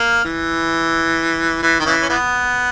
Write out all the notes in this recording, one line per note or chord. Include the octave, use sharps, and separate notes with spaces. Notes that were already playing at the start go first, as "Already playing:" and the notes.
Already playing: A#3
E3
E3
D#3
C#3 E3
C#4
E3 B3